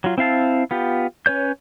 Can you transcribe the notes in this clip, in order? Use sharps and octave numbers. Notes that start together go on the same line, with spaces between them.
F#3 F4
C4 E4 F5 A5
B3 F4 G4
C#4 B4 C#5 G6